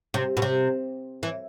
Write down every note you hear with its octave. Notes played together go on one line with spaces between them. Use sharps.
C3
B2
C3
E3